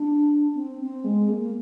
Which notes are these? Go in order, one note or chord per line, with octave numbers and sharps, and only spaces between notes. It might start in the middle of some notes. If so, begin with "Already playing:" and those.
Already playing: D4
C4
C4
G#3
A#3